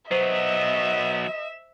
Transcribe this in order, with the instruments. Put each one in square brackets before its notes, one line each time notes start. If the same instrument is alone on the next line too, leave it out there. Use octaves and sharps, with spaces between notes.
[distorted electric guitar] F#3 B3 [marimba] C5 [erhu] D#5 [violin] E5 E7